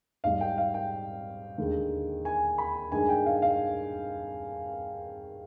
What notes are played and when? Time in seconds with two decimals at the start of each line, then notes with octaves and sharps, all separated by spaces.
0.24 G#2 G3 F5
0.41 G5
0.58 F5
0.74 G5
1.58 D#2 D3 G#3
2.25 G#5
2.58 B5
2.92 G2 D#3 G#3 G#5
3.09 G5
3.26 F5
3.42 F5